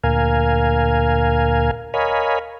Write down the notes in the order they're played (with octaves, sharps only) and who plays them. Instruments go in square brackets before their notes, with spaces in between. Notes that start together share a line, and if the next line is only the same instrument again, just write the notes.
[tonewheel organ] D2 A#2 A#4 F5 G#5
A#4 C#5 D#5 F5 G#5 B5